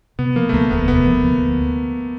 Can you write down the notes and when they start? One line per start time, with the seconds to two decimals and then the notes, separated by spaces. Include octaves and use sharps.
0.19 C3 B3
0.36 F3 A#3
0.49 A3
0.53 D2 A#3
0.71 E1 B3
0.88 C3 B3
1.06 F3
1.22 D2